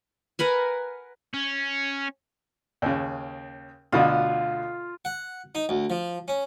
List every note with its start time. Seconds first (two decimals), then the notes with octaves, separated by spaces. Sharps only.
0.39 A#4 B4 F#5 G#5
1.34 C#4
2.82 D#2 C#3
3.92 D2 B2 D3 F4
5.05 F#5
5.55 D#4
5.69 D2
5.90 F3
6.28 C#4